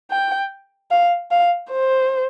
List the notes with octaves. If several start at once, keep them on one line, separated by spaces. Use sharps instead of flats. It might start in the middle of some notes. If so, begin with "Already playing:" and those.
G5
F5
F5
C5